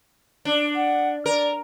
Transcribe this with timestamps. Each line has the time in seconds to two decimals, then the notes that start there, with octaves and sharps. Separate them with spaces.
0.45 D4
0.76 F#5
1.26 A#4 D5